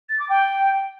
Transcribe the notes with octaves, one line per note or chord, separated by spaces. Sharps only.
A6
D6
G5